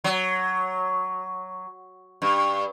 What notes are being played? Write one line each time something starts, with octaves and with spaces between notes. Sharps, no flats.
F#3
G2